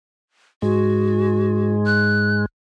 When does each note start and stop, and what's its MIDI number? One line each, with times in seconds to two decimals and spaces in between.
0.62 2.46 44
0.62 2.46 56
0.62 1.74 66
1.86 2.42 90